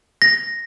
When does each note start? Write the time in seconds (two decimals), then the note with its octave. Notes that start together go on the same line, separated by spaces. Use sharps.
0.22 A#6